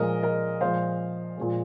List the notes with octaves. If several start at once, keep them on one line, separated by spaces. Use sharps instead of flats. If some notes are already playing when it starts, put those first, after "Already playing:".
Already playing: A#2 F3 G#3 A#4 D#5
A#4 D#5
A#2 F3 G#3 C5 F5
A#2 F3 G#3